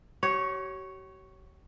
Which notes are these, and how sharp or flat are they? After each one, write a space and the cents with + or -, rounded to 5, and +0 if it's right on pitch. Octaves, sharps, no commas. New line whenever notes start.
G4 -45 C#5 +0